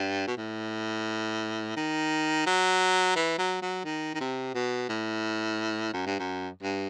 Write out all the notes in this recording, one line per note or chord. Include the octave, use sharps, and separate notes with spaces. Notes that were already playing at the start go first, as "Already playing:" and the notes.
Already playing: G2
B2
A2
D#3
F#3
E3
F#3
F#3
D#3
D#3
C3
B2
A2
F#2
G2
F#2
G2